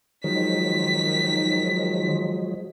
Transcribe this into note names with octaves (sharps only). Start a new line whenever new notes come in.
D#3 F3 F#3 G#3 B6